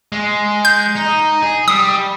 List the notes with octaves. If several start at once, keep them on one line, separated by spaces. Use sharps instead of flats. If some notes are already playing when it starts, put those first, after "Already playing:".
G#3
G6
D#4
G#4
G3 D#6